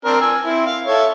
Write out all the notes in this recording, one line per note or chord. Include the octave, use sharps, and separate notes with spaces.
C4 D4 A#4
G#5 E6
C4 E4
F5
A4 C#5 E5